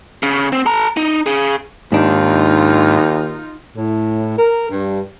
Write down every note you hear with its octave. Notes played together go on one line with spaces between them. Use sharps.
C#3
C4
A4 A#5
D#4
C#4 G#4
D#2 G#2 D4 D#4 F4
A2
A#4
G2